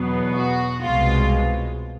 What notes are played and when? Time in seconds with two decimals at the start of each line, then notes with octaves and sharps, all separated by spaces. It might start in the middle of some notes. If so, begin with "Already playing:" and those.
Already playing: E2 B2 F#3 B3
0.33 F#4
0.81 C2 B2 G#3 F4